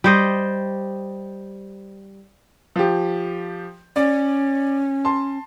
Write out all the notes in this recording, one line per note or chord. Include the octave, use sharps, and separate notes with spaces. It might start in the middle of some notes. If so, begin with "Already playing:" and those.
G3 C5 D#5
F3 G4
C#4 D5
A5 C6